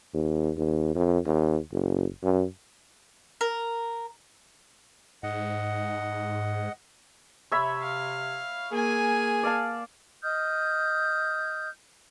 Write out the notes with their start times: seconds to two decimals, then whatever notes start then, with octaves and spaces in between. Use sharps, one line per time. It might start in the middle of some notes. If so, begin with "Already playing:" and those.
0.14 D#2
0.57 D#2
0.95 F2
1.26 D#2
1.72 F#1
2.23 F#2
3.41 A#4
5.23 G#2 D#5 F#5
7.52 C3 C#5 E5 B5
7.82 F5
8.71 A#3 G#4 G#5
9.43 D5 F5 A5
10.23 D#5 D#6 F6 G6